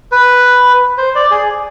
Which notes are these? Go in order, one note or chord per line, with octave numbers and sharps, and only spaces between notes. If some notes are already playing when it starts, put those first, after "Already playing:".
B4
C5
D5
G#4